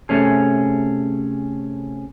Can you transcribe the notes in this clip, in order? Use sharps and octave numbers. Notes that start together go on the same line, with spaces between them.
C3 A3 C#4 G#4